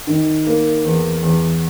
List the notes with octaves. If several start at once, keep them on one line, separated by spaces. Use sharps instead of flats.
D#3
A#3
E2
E2